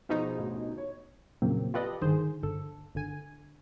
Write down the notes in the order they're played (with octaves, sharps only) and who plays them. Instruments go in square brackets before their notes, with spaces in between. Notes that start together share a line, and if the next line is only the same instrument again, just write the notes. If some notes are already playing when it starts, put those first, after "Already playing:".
[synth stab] B2 D#4 [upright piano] F3 G#4 C5
[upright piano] A1 D2
C#5
[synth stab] F2 A#2 C#3 F#3 A#3 C4
F4 G4 A4 B4 D5 D#5
G#1 G2 D3 D#3 G#4 C5
G1 D3 A4
G1 D3 G#5